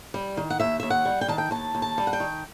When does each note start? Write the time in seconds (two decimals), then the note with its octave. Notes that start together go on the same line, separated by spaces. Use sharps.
0.14 G3
0.37 D#3
0.50 F#5
0.60 D#2 E5
0.80 D#2 E5
0.90 F#5
1.05 G3
1.21 G5
1.28 D#3 A5
1.38 G5
1.51 D#2 A5
1.75 D#2
1.82 A5
1.98 G3
2.07 F#5
2.13 G5
2.20 D#3